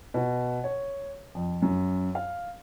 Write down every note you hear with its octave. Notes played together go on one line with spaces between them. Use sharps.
B2
C#5
F2
F#2
F5